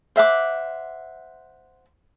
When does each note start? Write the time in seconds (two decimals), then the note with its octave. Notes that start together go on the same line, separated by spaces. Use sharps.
0.16 C5 E5 F#5 D6